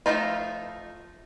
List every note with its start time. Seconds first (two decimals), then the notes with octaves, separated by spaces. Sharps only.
0.06 F3 F#3 A3 D#4 F4